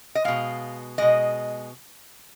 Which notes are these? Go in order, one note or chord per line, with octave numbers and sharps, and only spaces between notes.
D#5
B2 G#3 F5
B2 G#3 D#5